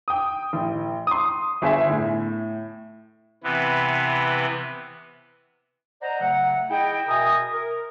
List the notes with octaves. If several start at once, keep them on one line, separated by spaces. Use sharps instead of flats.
G5 D#6
A1
C6 D#6
G1 G#4 E5 G#5
A2
C3 E3 B3
C5 D5 D#5 F#5 A#5
C#3 F#3 A3 F#5
E4 G#4 D#5 G5
B2 A#4 E5 G#5 A#5 D#6
A#4